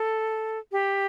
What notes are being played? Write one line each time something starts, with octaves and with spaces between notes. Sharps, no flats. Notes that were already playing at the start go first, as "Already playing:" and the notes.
Already playing: A4
G4